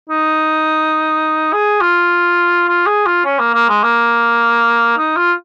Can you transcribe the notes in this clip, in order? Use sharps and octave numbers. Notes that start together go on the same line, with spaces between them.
D#4
G#4
F4
F4
G#4
F4
C#4
A#3
A#3
G#3
A#3
D#4
F4